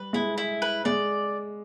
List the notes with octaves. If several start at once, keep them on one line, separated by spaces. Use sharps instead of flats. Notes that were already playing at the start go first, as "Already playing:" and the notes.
Already playing: G3 B4
G#3 E4
E4
B4
G#3 D5